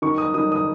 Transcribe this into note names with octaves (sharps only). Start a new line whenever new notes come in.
D#3 C#6
D#6
D#3 D#6
D#6